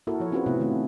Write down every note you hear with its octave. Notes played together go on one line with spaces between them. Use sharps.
A#3 E4 F#4 A4 A#4
F3 C#5
C4 C#4 F4 F#4 G#4 B4
C3 A3 B3 C4 E4
D#3 A3 E4